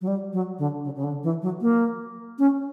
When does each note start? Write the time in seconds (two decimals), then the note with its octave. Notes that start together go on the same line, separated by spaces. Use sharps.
0.01 F#3
0.07 G3
0.33 F#3
0.59 D3
0.84 C#3
0.95 C#3
1.04 D3
1.23 E3
1.42 F#3
1.61 A#3
2.39 C#4